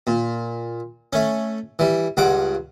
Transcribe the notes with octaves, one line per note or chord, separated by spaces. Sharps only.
A#2
A3 C#4
E3 G3
C#2 G2 F#5 D6